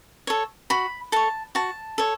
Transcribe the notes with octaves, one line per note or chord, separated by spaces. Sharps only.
A4 C#5
F#4 B5
A4 C#5 A5
F#4 A5
A4 C#5